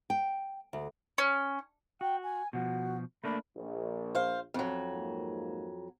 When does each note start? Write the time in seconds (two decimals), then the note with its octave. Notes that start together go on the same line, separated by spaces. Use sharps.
0.10 G5
0.73 D2
1.18 C#4
2.01 F#4 G5
2.24 G#5
2.53 B2 F3 F#4
3.24 A3 A#3 D4 B5
3.56 A#1
4.15 C5 F5
4.54 F2 F#3
4.92 G#2 A#3